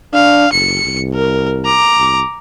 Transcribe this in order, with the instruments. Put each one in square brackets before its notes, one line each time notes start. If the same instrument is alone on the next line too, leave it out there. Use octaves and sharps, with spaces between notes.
[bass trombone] D4 [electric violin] F5
[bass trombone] F#1 [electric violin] C#7
[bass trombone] C2
[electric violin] A#4
A#5 D6
[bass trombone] C2